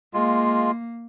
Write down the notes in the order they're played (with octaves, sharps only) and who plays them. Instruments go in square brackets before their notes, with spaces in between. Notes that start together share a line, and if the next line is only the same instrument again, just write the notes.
[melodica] G#3 F4 [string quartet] A#3